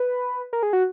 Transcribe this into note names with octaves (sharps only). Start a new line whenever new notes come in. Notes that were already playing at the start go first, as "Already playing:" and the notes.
Already playing: B4
A#4
G#4
F#4